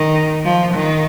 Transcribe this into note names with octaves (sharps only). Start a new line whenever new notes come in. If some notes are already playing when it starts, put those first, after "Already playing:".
Already playing: D#3
F3
D#3